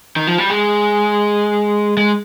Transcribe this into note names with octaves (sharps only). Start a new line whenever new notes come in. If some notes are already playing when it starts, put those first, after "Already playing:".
D#3
F3
G3
G#3
G#3